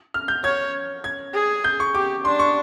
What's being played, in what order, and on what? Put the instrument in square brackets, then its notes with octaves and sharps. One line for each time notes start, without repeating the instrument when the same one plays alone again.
[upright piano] F6
G6
[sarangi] C#5 [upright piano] G#6
[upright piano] G#6
[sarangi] G#4
[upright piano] G6
C#6
[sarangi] G4 [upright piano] D6
[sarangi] D4 [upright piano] C6
[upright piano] C#6